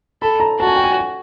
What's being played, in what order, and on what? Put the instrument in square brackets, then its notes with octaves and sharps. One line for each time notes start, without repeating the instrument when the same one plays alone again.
[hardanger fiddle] A4 [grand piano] B5
[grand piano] A#5
[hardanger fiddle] F#4 [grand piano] A5
[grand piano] G#5
G5
G#5